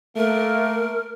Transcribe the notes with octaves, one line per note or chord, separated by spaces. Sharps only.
A3 A#3 A#4